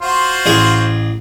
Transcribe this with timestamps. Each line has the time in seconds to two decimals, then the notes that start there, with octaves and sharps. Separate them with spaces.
0.01 F4 F#4 C5
0.46 A1 G#4 F5